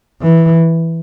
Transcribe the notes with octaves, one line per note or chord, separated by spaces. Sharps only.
E3